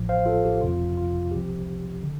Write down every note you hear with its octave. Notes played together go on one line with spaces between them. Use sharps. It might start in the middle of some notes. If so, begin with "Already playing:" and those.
Already playing: A1 A2 F3
C5 F5
F4 A4
G4
G1 F2 C3 F3 F4
F4
C2 C3 F3 G4
D3